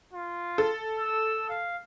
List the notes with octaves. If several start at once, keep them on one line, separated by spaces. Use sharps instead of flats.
F4
A4
E6
F5